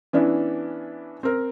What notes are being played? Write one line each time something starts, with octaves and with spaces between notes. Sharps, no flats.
E3 B3 C#4 D4 E4
C4 A#4